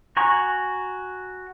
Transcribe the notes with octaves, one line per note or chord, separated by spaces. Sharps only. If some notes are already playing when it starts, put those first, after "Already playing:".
F#4 G#5 A#5 C#6